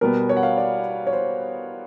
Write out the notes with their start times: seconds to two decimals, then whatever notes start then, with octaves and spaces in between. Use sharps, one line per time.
0.01 B2 G3 B3 A#4
0.29 C#5
0.37 F#5
0.43 F5
0.57 D5
1.07 C#5
1.13 C5